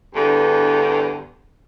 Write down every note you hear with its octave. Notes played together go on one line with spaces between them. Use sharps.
E2 G2 D3